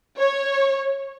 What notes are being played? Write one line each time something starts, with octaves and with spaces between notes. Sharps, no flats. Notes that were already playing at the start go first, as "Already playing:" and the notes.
C#5